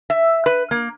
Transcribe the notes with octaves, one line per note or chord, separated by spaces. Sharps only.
E5
B4
A#3